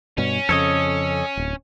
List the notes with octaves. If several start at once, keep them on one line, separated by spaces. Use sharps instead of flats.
G2 B2 C#4
F2 C#3 A4 C#5 D#5
D1